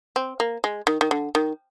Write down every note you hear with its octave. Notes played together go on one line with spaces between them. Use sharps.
C4
A#3
G#3
D#3
D#3
D3
D#3